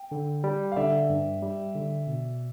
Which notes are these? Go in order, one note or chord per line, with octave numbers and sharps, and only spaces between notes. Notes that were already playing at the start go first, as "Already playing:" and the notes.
Already playing: G5
D3
G3
F5
D3 D5 E5
G2
G3
D3
B2